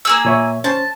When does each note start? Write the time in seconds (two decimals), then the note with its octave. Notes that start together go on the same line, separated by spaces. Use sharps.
0.05 A#3 G#4 E6
0.25 A#2 C#5 E5
0.64 C#4 C5 A5